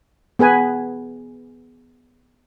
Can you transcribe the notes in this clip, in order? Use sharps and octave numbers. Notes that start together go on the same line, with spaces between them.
B3 G#4 B4 G#5